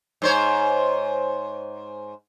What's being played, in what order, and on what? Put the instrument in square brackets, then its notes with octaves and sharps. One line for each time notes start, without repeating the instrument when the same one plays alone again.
[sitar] G#2 C5 C#5